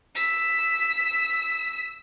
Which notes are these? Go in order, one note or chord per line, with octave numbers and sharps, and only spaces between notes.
E6 B6